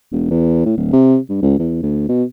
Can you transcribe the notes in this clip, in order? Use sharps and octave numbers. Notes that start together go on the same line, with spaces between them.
E1
E2
A2
D1
C3
G2
C#2
E2
D2
B2